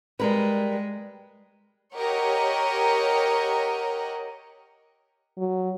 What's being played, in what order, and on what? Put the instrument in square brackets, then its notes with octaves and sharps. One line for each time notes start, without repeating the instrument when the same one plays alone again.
[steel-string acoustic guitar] G3 A#4 B4 [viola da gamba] G#3
[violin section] G4 A#4 C#5 D#5 F#5
[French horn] F#3